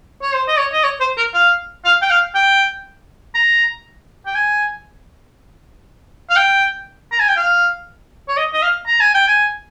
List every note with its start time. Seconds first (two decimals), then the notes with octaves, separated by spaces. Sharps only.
0.22 C#5
0.34 C5
0.48 D#5
0.58 C#5
0.73 D#5
0.84 C#5
1.00 C5
1.17 A#4
1.34 F5
1.85 F5
2.02 G5
2.10 F5
2.35 G5
3.35 A#5
4.26 G5
4.35 G#5
6.30 F5
6.36 G5
7.12 A#5
7.20 G#5
7.29 G5
7.37 F5
8.28 C#5
8.37 D#5
8.53 D#5
8.62 F5
8.87 A#5
9.00 G#5
9.14 G5
9.28 G#5